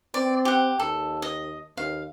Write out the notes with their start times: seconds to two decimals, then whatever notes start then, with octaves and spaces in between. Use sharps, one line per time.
0.14 C4 D5
0.45 G4 F#5
0.80 D#2 A4
1.22 D#5
1.77 D#2 F5